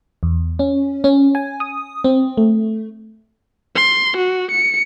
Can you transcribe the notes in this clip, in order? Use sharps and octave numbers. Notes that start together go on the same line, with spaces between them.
E2
C#4
C#4
G#5
D#6
C4
A3
C6
F#4
C#7